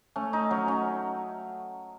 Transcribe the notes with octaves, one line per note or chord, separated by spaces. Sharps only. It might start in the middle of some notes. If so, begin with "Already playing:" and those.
A3 C#4
D#4
F#3 C#4
C#4